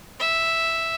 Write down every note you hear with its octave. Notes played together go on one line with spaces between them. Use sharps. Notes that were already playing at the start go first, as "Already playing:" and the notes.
E5